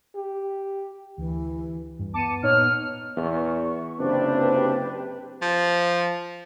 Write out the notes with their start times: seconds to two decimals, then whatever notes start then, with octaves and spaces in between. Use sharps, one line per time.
0.15 G4
1.18 D2 E3
1.99 G2
2.14 B3 A5 D6 C#7 D#7
2.43 A#2 D#4 C#5 F6
3.17 E2 C#6
3.99 F#1 C3 C4 D4 G4 B4
5.42 F3